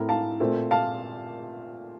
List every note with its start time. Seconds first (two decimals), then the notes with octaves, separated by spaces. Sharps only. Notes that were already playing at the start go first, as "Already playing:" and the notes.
Already playing: A2 A3 C4 A#4
0.09 F5 A5
0.40 A#2 A3 C4
0.71 F5 A5